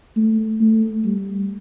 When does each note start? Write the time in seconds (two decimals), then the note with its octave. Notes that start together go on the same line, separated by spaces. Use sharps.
0.16 A3
0.61 A3
1.04 G3